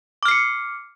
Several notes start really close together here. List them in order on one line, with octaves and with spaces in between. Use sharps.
D6 F6 C7 C#7